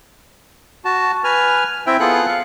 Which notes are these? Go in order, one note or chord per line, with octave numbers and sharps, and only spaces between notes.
F#4 A5
B4 G#5 F6
C4 E4 E5 G5
B3 F4 G#4 A4 F#5 F#6
F5